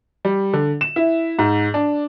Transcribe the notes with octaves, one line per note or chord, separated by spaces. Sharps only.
G3
D3
E7
E4
G#2
D4